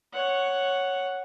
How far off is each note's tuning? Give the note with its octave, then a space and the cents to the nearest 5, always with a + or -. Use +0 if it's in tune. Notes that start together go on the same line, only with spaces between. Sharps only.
C#5 +0 F#5 +0